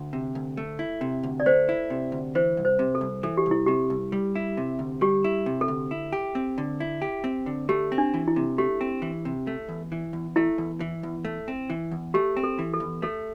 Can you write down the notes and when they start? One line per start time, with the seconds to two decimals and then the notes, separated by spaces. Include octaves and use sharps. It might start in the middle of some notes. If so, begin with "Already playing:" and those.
Already playing: D2
0.13 C3
0.35 D2
0.57 A3
0.79 E4
1.01 C3
1.23 D2
1.40 D5
1.46 A3 C5
1.69 E4
1.90 C3
2.12 D2
2.35 E3 C5
2.57 C2
2.65 C5
2.79 C3
2.95 A4
3.01 C2
3.23 E3 A4
3.37 G4
3.46 C2
3.51 E4
3.66 C3 G4
3.90 C2
4.12 G3
4.35 E4
4.57 C3
4.79 D2
5.01 G3 G4
5.24 E4
5.46 C3
5.61 A4
5.68 D2
5.91 E4
6.13 G4
6.35 C4
6.58 D3
6.80 E4
7.02 G4
7.24 C4
7.46 D3
7.69 A3 G4
7.92 C4
7.98 D4
8.14 E3
8.28 E4
8.36 C3
8.58 A3 G4
8.81 C4
9.02 E3
9.25 C3
9.47 A3
9.69 E2
9.92 E3
10.13 E2
10.36 A3 E4
10.58 E2
10.80 E3
11.03 E2
11.25 A3
11.48 C4
11.70 E3
11.91 E2
12.14 A3 G4
12.37 C4
12.43 A4
12.59 E3
12.74 A4
12.80 E2
13.02 A3 A4